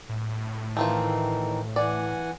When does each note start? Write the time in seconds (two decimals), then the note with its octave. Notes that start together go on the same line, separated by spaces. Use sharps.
0.09 A2
0.77 D#3 E3 A3 C4 D#4 F4
1.76 E3 D5 F#5 G#5